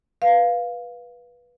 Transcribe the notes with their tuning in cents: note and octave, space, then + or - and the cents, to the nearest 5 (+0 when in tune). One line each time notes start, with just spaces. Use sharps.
B4 -15 F5 +0